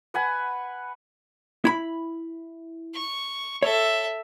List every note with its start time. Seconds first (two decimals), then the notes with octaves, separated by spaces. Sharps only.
0.14 B4 F#5 G#5 B5
1.65 E4 B5
2.94 C#6
3.62 A4 C#5 E5